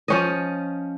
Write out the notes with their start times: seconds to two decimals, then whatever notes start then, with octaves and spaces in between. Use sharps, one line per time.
0.08 F3 C#4 D#5